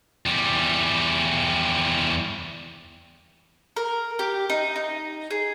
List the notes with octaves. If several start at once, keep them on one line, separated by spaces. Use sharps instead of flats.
E2 G3
A#4
G4
D#4
D#4
G#4